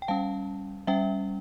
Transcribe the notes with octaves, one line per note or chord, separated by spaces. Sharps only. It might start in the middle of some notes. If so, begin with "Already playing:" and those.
G5
G3 C#4 F5 A5
G3 C#4 E5 G5